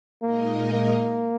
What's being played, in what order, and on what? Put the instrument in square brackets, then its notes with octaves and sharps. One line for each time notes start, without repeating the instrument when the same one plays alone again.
[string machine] A#2 G#3 D#4 A#4 D#5 [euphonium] A#3
[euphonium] A#3